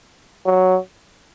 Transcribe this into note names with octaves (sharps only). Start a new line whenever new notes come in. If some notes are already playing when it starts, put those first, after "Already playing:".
F#3